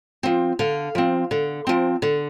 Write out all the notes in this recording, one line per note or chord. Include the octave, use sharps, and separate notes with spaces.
F3 C4
D3 F5
F3 C4
D3
F3 C4
D3